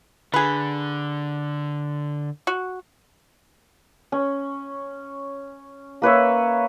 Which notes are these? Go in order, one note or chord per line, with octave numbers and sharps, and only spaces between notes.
D3 G#4 B4
F#4
C#4
A#3 B4 C#5 E5